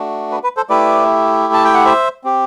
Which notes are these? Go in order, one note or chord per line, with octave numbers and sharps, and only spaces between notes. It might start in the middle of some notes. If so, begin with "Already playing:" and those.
Already playing: A3 D4 F#4
B4
B4
A4 C5
A3 E4 G4 B4 D5
A5
G5
F#5
C5 E5
C4 G4